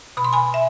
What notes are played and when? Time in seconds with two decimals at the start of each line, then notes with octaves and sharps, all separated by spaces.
0.17 B2 B5
0.24 C6
0.33 G#5 B5
0.54 E5